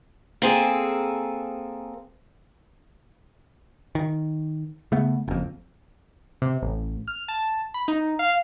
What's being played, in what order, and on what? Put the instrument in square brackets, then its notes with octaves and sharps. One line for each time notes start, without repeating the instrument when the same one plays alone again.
[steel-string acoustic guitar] A#3 C4 G#4 A4
[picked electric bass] D#3
C#3 A3 B3
F#1 F2
[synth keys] C3
A1
F6
A5
B5
D#4
F5